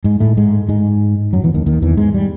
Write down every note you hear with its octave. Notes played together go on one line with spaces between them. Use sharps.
G#2 G#3
A2 A3
G#2 G#3
G#2 G#3
F#2 F#3
E2 E3
D#2 D#3
D#2 D#3
E2 E3
G#2 G#3
G3